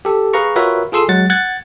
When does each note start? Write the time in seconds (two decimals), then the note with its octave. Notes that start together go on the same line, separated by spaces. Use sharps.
0.05 G4 A4
0.33 G#4 B4 F5 A#5 C#6
0.56 F4 F#4 A#4 B4 C#5 E5
0.92 F4 G#4 A4 C6 E6
1.08 F#3 G#3 F#5 A6
1.30 F#5 F#6 G#6 A6